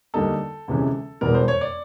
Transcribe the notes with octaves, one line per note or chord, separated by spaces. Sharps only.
D2 D3 G3 A#3 D#4 A4
D2 C3 E3 G#3 C#4
E1 E2 B2 G3 B3 A#4
C5
C#5
D5